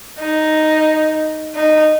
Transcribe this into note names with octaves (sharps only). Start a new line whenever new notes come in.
D#4
D#4